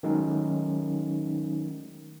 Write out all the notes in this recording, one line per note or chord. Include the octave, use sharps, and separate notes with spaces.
D#3 F#3 G#3 A3 C#4 D#4